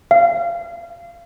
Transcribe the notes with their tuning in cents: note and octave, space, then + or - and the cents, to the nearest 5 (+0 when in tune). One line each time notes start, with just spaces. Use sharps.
F5 -25